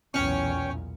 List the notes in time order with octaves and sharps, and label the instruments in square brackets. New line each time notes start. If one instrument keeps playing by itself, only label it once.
[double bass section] B1 E2 A#2 [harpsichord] C#4 [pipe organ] C#5 G5